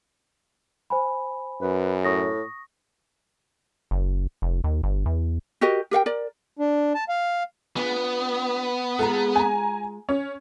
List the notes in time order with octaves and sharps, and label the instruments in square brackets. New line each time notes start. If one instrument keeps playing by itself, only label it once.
[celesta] C5 G#5 B5
[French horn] F#2 [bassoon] B4
[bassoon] A2 [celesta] C#6 D#6 A#6
[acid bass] F#1
F1
D#2
G1
E2
[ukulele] F#4 G4 A#4 D#5
G4 A#4 F5 G5
A#4 D5
[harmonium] D4
A5
F5
[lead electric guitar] B3 [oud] D4 F4 G#4
[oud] G#3 F4 G#4 [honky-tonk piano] A4 A#5
[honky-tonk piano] G#5 A#5
C#4